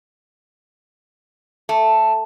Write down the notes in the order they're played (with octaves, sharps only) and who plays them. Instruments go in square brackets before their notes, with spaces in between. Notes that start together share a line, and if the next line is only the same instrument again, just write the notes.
[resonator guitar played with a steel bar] A3